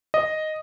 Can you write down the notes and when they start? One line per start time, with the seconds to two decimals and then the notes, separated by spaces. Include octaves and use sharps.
0.14 D#5